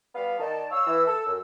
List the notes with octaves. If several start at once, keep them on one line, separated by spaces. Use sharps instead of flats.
G3 B3 F5
D#3 D#4 D5 A5
C#5 F5 E6
E3
A4 E6
F#2